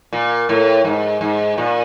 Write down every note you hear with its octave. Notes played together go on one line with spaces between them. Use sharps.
A#2
A2
G#2
G#2
A#2